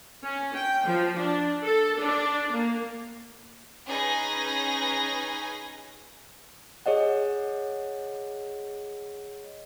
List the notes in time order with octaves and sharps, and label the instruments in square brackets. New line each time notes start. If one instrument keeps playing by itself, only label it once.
[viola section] C#4
G5
F3
D4
A4
D4
A#3
[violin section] C#4 D#4 G#4 B4 G#5 A#6
[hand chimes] G#4 C#5 D#5 F#5